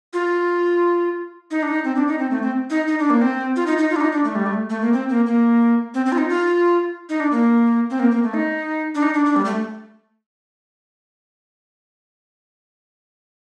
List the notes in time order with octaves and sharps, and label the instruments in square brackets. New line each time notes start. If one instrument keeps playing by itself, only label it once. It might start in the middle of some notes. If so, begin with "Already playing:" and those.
[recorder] F4
D#4
D4
D#4
C4
D4
D#4
C4
A3
C4
D#4
D#4
D4
A#3
C4
F4
D#4
D#4
F4
D4
D#4
D4
A3
G3
A3
A3
A#3
C4
A#3
A#3
C4
C4
F4
D#4
F4
D#4
D4
A#3
C4
A#3
A#3
A3
D#4
D4
D#4
D4
D4
G3
A3